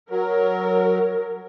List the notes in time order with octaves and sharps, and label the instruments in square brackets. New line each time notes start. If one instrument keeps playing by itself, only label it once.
[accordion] F#3 [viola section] A#4